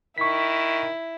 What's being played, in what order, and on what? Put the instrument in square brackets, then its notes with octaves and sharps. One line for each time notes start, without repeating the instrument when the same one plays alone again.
[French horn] D#3 [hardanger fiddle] E4 [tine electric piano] C#6 B6